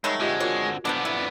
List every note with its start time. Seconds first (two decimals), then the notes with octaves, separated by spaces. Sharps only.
0.04 D#3 F#3 G#3 A3 C#5 B5 C#6
0.20 D3 G#3 C4 F4 G4 D#5
0.40 F4 F#4 A#4 C#5
0.85 F2 D3 F3 G3 B3 D4 D5
1.05 E4